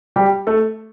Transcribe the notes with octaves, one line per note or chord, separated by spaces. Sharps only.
G3 G4
A3 A4